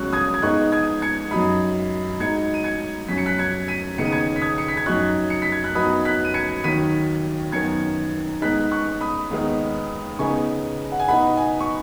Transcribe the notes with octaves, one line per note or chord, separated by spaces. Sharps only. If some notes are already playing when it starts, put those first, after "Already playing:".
Already playing: C#2 B2 F#3 C#4 C#6 F#6
D#6 G#6
G#6
G#2 G#3 B3 D#4 C#6 F#6
D#6 G#6
G#6 C#7
F#2 F#3 D#4 B5 D#6
G#2 F#3 D#4 G#6 C#7
D#7
G#6 C#7
F#2 F#3 C#4 B6
C#7
F#6 B6
G#6 C#7
B6 D#7
D#2 C#3 B3 D#4 C#7
D#7
G#6 C#7
B6
D#6 G#6
C#7
B6
G#6
F#2 F#3 D#4 C#6 F#6
C#7
B6
G#6
F#6
F#2 F#3 B3 D#4 B5 D#6
F#6 B6
D#7
G#6 C#7
D#2 D#3 F#3 B6 D#7
F#2 D#3 B3 G#6 C#7
G#2 G#3 B3 D#4 F#6 B6
C#6 F#6
B5 D#6
D#2 D#3 G#3 B3 D#4
C#3 B3 D#4 G#5 C#6
F#5
G#5
B2 B3 D#4 F#5 B5
G#5
C#6